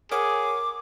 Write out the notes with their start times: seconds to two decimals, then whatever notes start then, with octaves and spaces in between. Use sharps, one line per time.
0.12 G#4 A#4 C#5 F#5 D6